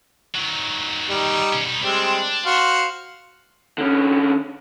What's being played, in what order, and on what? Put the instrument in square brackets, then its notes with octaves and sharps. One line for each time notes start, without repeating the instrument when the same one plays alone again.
[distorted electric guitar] D#3 F#3
[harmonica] G3 D#4
[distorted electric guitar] B2 C#4
B2 D#4
[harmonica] G3 G#3 C4 [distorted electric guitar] D4
[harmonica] F#4 C5 F5
[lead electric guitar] D3 C#4